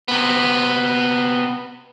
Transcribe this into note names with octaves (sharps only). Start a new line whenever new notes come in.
C3 B3